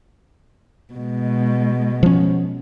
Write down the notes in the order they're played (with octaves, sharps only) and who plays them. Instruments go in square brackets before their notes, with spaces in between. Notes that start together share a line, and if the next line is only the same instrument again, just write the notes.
[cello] B2 G#3
[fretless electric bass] F3 C#4